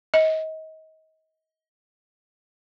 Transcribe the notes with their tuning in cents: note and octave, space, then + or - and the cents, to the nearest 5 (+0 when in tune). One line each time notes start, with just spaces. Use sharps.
D#5 +30